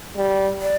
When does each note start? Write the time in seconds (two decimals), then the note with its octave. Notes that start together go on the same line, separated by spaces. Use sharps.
0.17 G3
0.62 D5